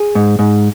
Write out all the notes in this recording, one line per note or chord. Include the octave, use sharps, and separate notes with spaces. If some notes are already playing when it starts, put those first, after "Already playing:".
Already playing: G#4
G#2
G#2